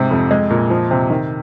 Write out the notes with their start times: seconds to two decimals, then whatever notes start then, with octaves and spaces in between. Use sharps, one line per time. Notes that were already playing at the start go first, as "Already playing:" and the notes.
Already playing: G#2 C3
0.11 F2
0.31 G#3
0.50 A#2
0.70 F3
0.91 C3
1.10 D#3